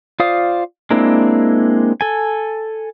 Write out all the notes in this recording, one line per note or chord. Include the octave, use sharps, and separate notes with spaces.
F4 C5 D5 F5 D#6
G#3 A#3 C4 D4 E4
A4 G#5